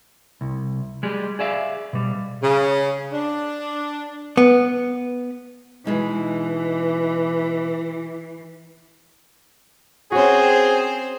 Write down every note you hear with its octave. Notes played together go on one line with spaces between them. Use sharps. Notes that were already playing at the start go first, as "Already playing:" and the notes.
C2
G3 G#3
G#4 D5 E5 F5
B2 G3
C#3
D4
B3
B2 E3 G#3 D#4
C4 C#4 F#4 G#4 C5